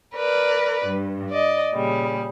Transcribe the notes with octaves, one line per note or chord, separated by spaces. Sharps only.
A#4 B4 D5
G2
D5 D#5
A#2 C#3 G3